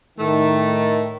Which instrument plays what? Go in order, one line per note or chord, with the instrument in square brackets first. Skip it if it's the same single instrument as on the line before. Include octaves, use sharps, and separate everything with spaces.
[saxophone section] A2 A3 [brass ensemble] D#3